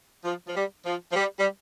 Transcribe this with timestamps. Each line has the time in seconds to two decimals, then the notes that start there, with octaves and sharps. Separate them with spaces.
0.25 F3
0.47 F3
0.55 G3
0.86 F3
1.12 F3
1.16 G3
1.39 G3